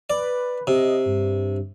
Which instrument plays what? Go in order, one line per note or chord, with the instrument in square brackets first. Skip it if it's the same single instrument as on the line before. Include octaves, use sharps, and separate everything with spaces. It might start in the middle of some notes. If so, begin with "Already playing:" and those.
[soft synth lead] B4 [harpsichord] D5
[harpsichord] C3 [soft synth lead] D#5
[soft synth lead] G2